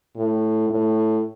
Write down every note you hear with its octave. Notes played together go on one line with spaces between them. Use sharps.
A2
A2